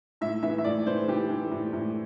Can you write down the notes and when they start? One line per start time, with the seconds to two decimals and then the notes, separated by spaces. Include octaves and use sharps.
0.21 A2 E5
0.43 E3 E5
0.58 E5
0.64 A2 D5
0.86 E3 C5
1.08 E3 G4
1.30 E3
1.51 A2
1.73 A2